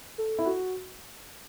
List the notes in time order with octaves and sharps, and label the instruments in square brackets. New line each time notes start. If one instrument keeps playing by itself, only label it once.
[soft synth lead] A4
[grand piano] E4
F#4